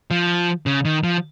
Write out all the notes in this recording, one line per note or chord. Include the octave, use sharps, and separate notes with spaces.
F3
C#3
D#3
F3